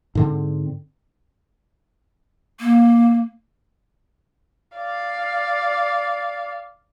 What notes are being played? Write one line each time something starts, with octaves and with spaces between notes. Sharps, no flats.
G#2 D3 C4
A#3
D5 F5